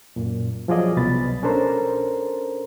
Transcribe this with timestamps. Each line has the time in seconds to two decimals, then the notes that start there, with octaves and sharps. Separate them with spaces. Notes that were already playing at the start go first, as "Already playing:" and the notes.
0.16 F#2 A#2
0.68 F3 F#3 F4 G#4 D5 D#5
0.97 C2 B2 B5 A6
1.43 C#4 D4 A4 A#4 C5 A#5